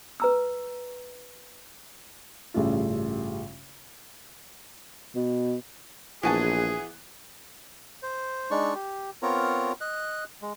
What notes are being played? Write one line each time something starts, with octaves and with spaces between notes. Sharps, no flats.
B4 A#5 E6
A1 G2 C#3 A3 F4
B2
A#1 E3 B3 F#4 G#4 G#5 A5
C5
G#3 D4 D#4 D5 C#6
G4
B3 C4 F4 A#4 C#5 A#5
D#5 F#6
G#3